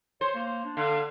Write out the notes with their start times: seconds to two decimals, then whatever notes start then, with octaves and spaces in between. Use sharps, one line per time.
0.21 C5 C#5
0.35 A#3
0.65 D4
0.77 D3 F5